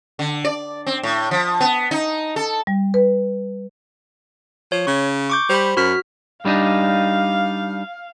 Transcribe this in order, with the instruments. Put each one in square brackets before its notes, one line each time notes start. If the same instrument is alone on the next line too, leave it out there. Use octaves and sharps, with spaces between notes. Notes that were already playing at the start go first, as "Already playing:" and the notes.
[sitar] D3
D5
C4
A2
F3
B3
D#4
A4
[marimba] G3
B4
[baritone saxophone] F3 [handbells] C#5
[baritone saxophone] C#3 [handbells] C#6
[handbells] C#6 D6 G6
[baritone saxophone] G3 [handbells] C5 B5
[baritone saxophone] F#2 [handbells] F#4 F6 B6
[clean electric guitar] G3 D4 D#4 [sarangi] F5